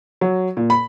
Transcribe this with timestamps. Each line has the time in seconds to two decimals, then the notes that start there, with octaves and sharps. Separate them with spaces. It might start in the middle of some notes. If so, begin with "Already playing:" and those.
0.21 F#3
0.57 A#2
0.70 B5